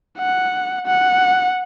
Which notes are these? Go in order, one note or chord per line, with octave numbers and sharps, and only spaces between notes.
F#5
F#5